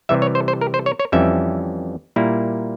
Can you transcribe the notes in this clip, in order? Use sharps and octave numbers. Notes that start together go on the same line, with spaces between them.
C3 E3 G3 E5
C#5
C5
C5
A#4
C5
C#5
C#5
F2 E3 G3 C#4 E5
A#2 G3 A#3 E4